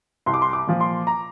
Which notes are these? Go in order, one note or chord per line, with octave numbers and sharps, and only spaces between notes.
C2 C6
D6
C6
D6
A#2 F3
C6
A#5